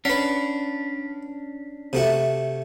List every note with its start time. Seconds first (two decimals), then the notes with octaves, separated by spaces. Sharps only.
0.05 C#4 D4 B4 F#5
1.93 C3 A3 F#4